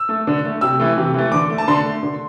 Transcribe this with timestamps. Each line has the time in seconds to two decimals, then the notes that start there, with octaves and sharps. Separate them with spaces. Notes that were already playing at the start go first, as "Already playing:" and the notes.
Already playing: E6
0.09 A3
0.27 D3
0.45 A3
0.61 C3 E6
0.80 E3 A3
0.97 C3
1.14 E3 A3
1.32 D3 D6
1.50 A3
1.58 A5
1.68 D3 C6
1.84 A3
2.03 D3